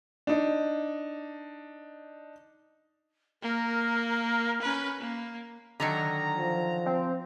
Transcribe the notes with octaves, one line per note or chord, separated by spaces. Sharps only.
D4 D#4
A#3 A#4
C#4 B4
A#3
D3 D#3 F#3 A#5
F3
C4